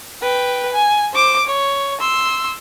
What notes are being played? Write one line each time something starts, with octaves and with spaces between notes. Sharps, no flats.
B4 G5
G#5
C5 D6
C#5
C6 E6